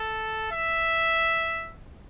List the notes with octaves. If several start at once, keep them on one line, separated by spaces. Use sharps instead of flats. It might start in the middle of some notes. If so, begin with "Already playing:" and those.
Already playing: A4
E5